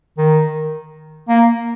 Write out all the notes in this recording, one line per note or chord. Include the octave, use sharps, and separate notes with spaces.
D#3
A#3